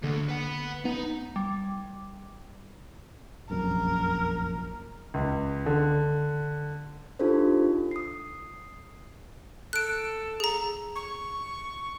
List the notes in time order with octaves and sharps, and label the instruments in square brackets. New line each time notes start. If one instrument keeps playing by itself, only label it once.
[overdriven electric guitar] D2 [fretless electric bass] D3 A#3
[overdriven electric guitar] B4 F#5
[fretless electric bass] B3 [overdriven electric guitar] D#4
[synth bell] G3
[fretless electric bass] F1 A#1 F#2 [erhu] A#4
[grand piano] C#2
D3
[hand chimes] D4 D#4 F4 G4 A4 C5
D#6 C7
[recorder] A4 [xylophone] F#6 D7
[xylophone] G#4 A#5
[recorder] C#6